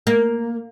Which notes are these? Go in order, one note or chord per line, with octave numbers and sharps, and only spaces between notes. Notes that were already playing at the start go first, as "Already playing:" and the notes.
A#3